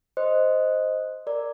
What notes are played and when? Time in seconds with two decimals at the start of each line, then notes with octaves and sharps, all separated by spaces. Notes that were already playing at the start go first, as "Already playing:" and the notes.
0.17 C5 D#5
1.27 A#4 D5